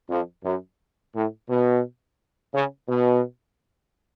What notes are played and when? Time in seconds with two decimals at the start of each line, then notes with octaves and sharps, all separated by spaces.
0.09 F2
0.44 F#2
1.14 A2
1.48 B2
2.53 C#3
2.89 B2